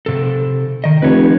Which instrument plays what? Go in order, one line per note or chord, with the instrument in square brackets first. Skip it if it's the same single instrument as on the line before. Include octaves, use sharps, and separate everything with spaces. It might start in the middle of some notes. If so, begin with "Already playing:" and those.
[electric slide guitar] C3 A4
D#3 D#5
[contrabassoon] F1 [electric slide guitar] B4 C#5